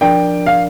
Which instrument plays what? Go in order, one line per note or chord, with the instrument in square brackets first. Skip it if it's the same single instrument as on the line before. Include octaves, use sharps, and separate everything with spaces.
[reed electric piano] F3 D4 A#4 D5 [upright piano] G5
[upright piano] F5